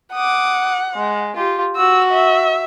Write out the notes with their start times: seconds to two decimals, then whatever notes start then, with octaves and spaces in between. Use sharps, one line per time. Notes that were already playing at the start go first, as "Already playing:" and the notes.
0.13 F#5 D6 D#6
0.94 G#3
1.36 F4 G4
1.76 F#4 E6
2.12 E5